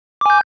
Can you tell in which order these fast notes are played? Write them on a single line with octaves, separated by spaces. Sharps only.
D6 G#5 G6